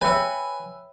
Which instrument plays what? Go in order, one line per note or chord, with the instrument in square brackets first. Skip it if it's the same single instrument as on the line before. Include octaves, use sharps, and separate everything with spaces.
[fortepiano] B4 E6 [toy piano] C#5 E5 G5 [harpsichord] G#5